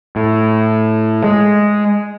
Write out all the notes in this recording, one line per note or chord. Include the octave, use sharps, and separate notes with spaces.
A2
G#3